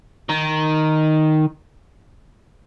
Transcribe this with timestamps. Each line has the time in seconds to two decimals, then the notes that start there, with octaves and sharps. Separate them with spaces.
0.29 D#3